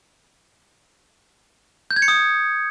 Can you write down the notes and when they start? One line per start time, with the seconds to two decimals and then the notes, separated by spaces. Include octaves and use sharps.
1.91 G6
1.96 G#6
2.02 C#7
2.08 D#6